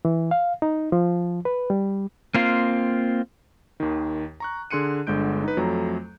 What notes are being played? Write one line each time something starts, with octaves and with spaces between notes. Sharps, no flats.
E3
F5
D#4
F3
B4
G3
A#3 C4 F4
D#2 D#3
A#5 C#6 F#6
D3 G#4 C6 F#6 C#7 D#7
G1 D3 G#3 G6 D7
D#4 B4
F2 F#3 A3 A#5